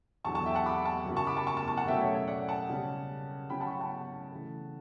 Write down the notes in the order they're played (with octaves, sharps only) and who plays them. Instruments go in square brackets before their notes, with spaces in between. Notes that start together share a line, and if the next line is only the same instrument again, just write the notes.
[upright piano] E2 D3 F#3 A5 C#6
A5 C#6
E5 G5
F#5 A5
B5 D6
A5 C#6
F#2 C#3 F#3
A5 C#6
B5 D6
A5 C#6
A5 C#6
A5 C#6
A5 C#6
F#5 A5
B2 F#3 A3 C#4 E5 G5
C#5 E5
C#5 E5
D5 F#5
F#5 A5
C#3 G3 C#4
C#3 F#3 C#4 G5 B5
F#5 A5
C#6
G5 B5
F#5 A5
C#3 E3 A3